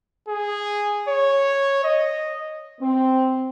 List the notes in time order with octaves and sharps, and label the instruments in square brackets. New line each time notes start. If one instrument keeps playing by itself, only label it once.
[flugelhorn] G#4
C#5
D#5
[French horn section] C4